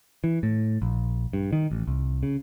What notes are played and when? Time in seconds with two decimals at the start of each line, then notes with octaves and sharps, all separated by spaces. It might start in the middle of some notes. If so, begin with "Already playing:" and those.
0.24 E3
0.43 A2
0.82 A#1
1.33 G2
1.53 D#3
1.71 A1
1.87 C2
2.23 C#3